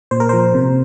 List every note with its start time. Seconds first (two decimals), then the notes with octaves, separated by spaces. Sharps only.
0.11 A#2 C5
0.20 A#4
0.29 F3 C5
0.54 C3